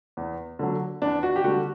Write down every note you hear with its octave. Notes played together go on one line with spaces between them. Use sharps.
E2
D3 F#3
E2 D4
F#4
G4
D3 G3 F#4